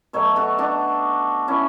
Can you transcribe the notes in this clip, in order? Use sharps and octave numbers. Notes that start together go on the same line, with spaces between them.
B2 F#3 A3 A4 C#5
F#4 A4
D4 F#4
C#4 E4